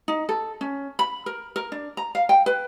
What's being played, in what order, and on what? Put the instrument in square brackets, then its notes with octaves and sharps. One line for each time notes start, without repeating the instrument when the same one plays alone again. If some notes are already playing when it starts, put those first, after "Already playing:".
[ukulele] D#4
A4
C#4
B5
A#4
A#4
D4
A#5
F5
G5
B4